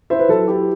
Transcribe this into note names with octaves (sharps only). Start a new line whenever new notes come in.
E4 C5 E5
B4
F#3 A4
E4 G4